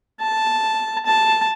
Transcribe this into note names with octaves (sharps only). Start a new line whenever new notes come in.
A5
A5